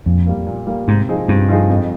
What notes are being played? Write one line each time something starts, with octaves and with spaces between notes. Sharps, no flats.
F2 A#2
G3 A#3
A#2
G3 A#3
G#2 C3
F3 C4 D#4 G#4
G2 C3
F3 C4 D#4 G#4
F2